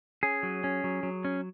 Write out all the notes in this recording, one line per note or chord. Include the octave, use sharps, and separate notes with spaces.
C#4 G#4
F#3
C#4
F#3
F#3
C#4